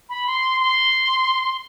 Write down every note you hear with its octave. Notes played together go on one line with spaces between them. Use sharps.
B5
C6
C6